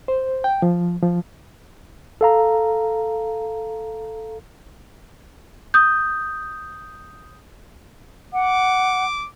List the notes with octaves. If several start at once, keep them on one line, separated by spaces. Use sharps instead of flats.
C5
G5
F3
F3
A4 F5 A#5
D#6 G6
F#5 D6